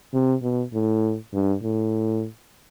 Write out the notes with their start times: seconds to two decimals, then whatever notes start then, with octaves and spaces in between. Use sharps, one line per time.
0.14 C3
0.42 B2
0.74 A2
1.34 G2
1.63 A2